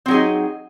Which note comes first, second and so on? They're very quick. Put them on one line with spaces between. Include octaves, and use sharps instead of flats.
C4 F#3 G#4 D#4